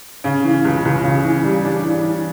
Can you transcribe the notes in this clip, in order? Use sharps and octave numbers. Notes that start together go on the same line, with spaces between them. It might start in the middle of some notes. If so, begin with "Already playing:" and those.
C#3
E3
C#2
C#2
C#3
E3
G3
D4
E3
E3